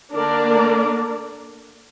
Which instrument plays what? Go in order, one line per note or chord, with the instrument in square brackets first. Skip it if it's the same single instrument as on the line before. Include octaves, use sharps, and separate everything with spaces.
[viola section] D3 A#3 D4 A#4 D5